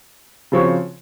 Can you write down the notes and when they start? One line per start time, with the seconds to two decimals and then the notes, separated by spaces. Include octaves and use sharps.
0.52 C#3 F3 C4 F#4 C#5